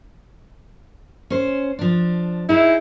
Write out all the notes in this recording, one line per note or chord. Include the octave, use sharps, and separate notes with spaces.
C#4 C5
F3 D4
D#4 E4 G#4